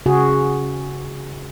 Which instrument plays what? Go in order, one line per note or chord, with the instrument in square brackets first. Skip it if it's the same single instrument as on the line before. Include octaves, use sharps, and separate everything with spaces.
[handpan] C#3 F#4 G#4